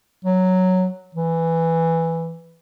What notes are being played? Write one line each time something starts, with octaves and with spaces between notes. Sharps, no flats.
F#3
E3